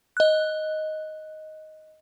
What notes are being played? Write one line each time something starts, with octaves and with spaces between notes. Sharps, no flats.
D#5 F#6